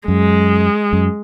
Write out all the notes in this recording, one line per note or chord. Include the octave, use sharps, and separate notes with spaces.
F#2 G#3
F#2